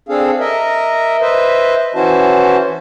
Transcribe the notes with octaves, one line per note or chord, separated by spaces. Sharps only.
C4 D4 G#4 A4 F5
A#4 D#5 E5
B4 C5 D#5 E5
E3 C#4 E4 F#4 C5 A5